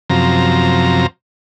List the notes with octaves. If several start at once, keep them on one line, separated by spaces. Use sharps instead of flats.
F#2 C3 F3 A#5